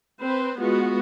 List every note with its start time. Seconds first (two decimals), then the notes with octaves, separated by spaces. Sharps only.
0.22 C4 B4 C5
0.58 G#3 B3 F4 F#4